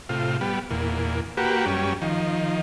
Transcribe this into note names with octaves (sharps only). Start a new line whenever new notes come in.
A2 C3 F4
G3 B3
E2 A#2
A#3 F#4 G4 B4
F#2 G3 C#4
D#3 F3